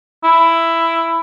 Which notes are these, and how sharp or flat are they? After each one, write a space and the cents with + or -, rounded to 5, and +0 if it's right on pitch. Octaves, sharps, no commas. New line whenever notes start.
E4 +10